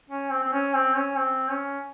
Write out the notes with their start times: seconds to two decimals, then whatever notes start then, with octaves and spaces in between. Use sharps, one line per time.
0.10 C#4
0.31 C4
0.43 C4
0.53 C#4
0.75 C4
0.96 C#4
1.18 C4
1.51 C#4